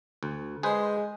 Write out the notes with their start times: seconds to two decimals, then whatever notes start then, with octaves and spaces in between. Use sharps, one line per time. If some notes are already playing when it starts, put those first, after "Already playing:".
0.23 D2
0.63 G#3 G#4 B4 C5